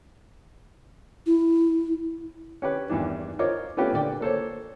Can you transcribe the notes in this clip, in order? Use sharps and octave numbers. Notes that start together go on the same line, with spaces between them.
E4
C#4 G4 B4
E2 G2 D#3 D4
F4 A#4 C5 C#5 D#5 D6
A3 B3 C#4 F4 G4 B4
A#2 D3 D5 G5
A#3 A4 C5 C#5